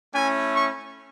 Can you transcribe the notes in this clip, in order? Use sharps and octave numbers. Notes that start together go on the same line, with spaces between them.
A3 C#4 E4 G#5
C#6